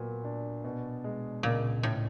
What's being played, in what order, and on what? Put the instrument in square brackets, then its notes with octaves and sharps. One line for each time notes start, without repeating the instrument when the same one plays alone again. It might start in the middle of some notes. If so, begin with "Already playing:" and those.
Already playing: [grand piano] A#2 F#3 B3
D4
B2
G#3
[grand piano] C#2 [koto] A#2
[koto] A2 [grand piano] C#4